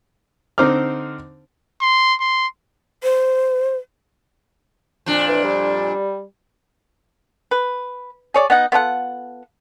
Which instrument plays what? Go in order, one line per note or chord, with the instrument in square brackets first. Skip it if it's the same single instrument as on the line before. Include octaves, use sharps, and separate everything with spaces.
[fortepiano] D3 C4 D#4 C5 D6 F6
[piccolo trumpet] C6
C6
[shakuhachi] C5
[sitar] F2 A#2 D4
[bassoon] E3
G3
[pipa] B4
G#4 C#5 D5
B3 D#4 F#5
B3 F4 A4 F#5